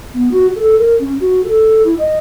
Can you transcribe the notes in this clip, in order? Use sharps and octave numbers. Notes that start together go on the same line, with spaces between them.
B3
F#4
A4
A#4
C#4
F#4
A4
E4
D#5